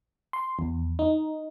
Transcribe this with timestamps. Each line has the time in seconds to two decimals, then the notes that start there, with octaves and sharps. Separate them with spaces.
0.33 C6
0.59 E2
0.99 D#4